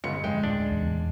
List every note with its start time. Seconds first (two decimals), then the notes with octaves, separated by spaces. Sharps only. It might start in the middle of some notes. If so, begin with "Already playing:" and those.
0.04 G1 C#2 G2 C#7
0.24 F2 D3 G#3 G5
0.43 D2 A2 D4
0.69 D#1 E2 C#3